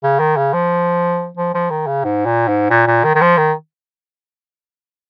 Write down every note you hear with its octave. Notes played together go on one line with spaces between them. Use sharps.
C#3
D#3
C#3
F3
F3
F3
D#3
C#3
G#2
A#2
G#2
A#2
A#2
D#3
D#3
F3
D#3